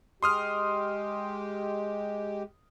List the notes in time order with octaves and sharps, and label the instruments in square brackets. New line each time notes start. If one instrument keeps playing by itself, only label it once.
[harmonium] G#3 G4 [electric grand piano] C6 D#6 F6